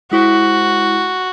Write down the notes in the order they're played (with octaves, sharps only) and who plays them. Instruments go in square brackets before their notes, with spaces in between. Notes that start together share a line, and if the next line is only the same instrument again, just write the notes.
[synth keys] G#3 E4 C5 [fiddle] F#4